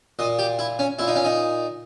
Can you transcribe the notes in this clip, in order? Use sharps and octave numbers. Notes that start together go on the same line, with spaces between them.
A#2 D#5
G4
E4
C#4
A#2 E4
D#4
C#4
D#4